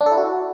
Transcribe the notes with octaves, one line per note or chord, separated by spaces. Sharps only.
D4
A4
E4
F#4